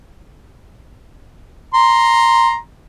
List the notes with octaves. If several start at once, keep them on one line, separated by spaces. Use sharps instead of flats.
A#5 C6